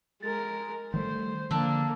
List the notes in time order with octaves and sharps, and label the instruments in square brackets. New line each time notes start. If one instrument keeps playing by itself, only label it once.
[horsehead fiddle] G#3 A#4 [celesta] A6
[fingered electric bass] D#3 G3 A3 [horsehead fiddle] C5
[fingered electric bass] D3 F3 [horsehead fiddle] A#3 [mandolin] D4 [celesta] A5 E6